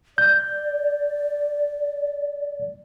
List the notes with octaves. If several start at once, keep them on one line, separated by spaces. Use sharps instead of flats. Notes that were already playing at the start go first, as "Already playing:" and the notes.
D5 G6